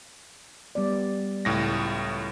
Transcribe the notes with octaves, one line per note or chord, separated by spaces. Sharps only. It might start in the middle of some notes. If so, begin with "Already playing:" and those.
G3 B3 D5
C#2 A2 A#6